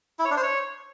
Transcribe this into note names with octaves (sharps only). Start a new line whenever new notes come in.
E4
C#5
D4
C5
C#5